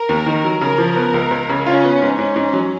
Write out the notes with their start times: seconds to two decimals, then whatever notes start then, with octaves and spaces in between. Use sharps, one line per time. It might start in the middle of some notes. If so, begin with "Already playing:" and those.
Already playing: A#4
0.09 D#2
0.26 D#3
0.44 F#3
0.61 C#3 A#4
0.78 F3
0.96 B3
1.14 C#2
1.31 C#2
1.49 C#3
1.66 C#4 F4
1.84 B3
2.02 G#2
2.18 G#2 C#4
2.36 G#2
2.53 F#3